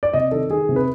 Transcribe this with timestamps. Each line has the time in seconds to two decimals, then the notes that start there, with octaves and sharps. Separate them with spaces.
0.03 D5
0.13 C3 D#5
0.31 D#3 A4
0.50 D#3 G#4
0.69 C3
0.76 B4